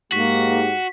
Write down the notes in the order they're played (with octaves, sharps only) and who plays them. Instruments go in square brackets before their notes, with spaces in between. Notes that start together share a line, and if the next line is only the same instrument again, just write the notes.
[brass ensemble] G#2 G4 [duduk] A#3 [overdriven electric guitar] F#4 [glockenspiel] B6